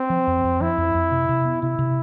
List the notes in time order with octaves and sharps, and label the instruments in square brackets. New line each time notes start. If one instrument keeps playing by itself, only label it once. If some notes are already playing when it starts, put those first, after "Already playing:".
Already playing: [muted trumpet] C4
[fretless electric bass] F3
F2
F2
[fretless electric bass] F3 [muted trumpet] E4
[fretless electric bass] F2
F2
C3
C3
B3
[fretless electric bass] C3 [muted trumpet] E4
[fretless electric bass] C3